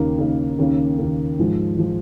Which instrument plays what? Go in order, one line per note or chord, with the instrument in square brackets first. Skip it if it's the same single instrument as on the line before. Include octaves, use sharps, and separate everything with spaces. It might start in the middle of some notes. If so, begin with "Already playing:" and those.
Already playing: [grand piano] D#2 C#3 A#3 D#4
D#2 C#3 A#3 D#4
D#2 C#3 A#3
D#2 C#3 A#3
G#2 F3 G#3
F3 G#3